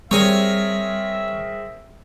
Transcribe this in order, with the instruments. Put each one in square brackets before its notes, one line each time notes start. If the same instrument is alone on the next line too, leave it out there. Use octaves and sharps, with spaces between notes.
[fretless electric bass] G3 [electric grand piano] C4 G#4 A#4 [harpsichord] C#5 G#5 C#6 [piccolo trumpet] E5